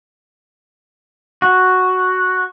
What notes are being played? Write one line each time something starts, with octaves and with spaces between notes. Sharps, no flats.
F#4